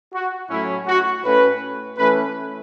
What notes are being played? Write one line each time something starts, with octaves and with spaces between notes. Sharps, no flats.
F#4
A2 F#3 A3 C#4 E4
F#4
A2 A3 C#4 B4
E3 A3 C#4 B4